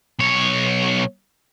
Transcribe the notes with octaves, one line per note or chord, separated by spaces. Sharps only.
B1 C#5